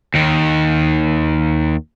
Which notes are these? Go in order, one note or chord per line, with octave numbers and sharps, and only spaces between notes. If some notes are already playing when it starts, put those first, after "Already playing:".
D#2 D#3